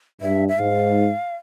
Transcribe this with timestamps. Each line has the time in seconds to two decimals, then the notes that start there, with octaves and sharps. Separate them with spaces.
0.21 G2 E5
0.48 E5
0.58 G#2 F5